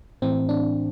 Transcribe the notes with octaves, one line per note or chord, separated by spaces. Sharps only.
A2 E3 C4
D4